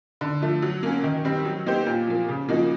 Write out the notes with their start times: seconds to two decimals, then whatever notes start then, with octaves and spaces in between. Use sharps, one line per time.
0.21 D3
0.41 F3 A3
0.62 F#3
0.83 A#3 C#4
1.04 D#3
1.24 G3 C4 D#4
1.45 F#3
1.66 A#3 D#4 G4 C5
1.86 A#2
2.07 F3 A#3
2.29 C#3
2.49 F3 A#3 D#4 F#4